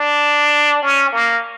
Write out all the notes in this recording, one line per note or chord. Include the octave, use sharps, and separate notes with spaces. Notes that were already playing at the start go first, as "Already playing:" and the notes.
Already playing: D4
C#4
A#3